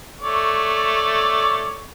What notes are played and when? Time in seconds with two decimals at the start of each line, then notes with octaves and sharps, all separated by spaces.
0.21 A3 C#5 D5